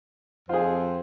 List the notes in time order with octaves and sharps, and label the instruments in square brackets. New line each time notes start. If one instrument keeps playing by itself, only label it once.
[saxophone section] F2 C5 [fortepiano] F4 G#4